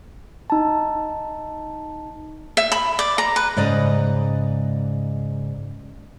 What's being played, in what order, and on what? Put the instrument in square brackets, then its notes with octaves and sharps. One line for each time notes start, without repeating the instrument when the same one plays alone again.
[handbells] D#4 A5
[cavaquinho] E5
B5
D5
A#5
B4
[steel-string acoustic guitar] G#2 C#3 D5 D#5 A#5